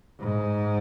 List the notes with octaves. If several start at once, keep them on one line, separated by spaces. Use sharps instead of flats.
G#2